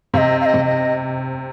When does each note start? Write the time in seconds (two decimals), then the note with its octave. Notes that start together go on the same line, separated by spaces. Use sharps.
0.14 C3 F5
0.18 D#5
0.41 F5
0.46 D#5
0.54 C3
0.66 D#5